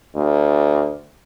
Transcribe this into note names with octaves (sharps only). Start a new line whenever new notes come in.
D2